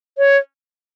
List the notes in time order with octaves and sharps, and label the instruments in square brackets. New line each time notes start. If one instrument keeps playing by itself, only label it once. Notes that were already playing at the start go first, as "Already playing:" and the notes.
[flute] C#5